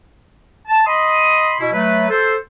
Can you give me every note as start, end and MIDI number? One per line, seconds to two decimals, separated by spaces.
0.68 0.83 81
0.85 1.54 75
0.85 1.54 83
0.85 1.54 84
0.85 1.54 87
1.60 1.69 47
1.60 1.69 64
1.73 2.07 54
1.73 2.07 57
1.73 2.07 71
2.10 2.35 69
2.10 2.35 72